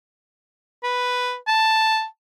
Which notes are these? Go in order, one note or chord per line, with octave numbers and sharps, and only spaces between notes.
B4
A5